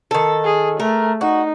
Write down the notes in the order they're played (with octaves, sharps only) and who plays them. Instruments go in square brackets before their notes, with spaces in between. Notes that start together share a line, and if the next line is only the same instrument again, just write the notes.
[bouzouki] D#3 A4
[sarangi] G#4
[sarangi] A3 [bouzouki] A#4
[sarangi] D#4 [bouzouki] F#4